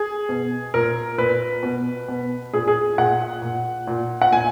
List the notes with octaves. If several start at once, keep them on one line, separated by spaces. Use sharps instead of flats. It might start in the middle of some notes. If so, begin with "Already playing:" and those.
Already playing: G#4
B2
A#2 A#4
A#2 B4
B2
B2
A#2 G#4
G#4
A#2 F#5
A#2
A#2
F#5
A#2 G#5